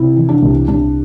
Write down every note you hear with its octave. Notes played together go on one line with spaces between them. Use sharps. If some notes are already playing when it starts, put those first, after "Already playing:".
Already playing: C3 E4
E3
D4
C2
C2 D4